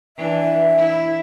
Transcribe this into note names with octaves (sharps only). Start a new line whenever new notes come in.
E3 D4 E5
E4